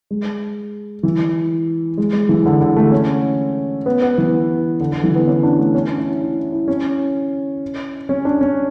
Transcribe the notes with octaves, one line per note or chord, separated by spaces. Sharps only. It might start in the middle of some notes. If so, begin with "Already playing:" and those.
G#3
E3
G#3
G#3
E3
D3
D3
A3
C#4
B3
B3
E3
D3
D3
E3
B3
C#4
D4
A3
C#4
D4
E4
E4
E4
C#4
C#4
D4
C#4